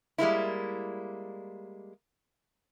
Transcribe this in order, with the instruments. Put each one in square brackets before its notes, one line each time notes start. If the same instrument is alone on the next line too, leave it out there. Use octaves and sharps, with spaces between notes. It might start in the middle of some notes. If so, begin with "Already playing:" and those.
[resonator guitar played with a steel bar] G3 G#3 A#3 E4